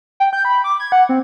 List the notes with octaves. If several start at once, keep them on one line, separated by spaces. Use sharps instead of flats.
G5
G6
B5
D6
G#6
F#5
C4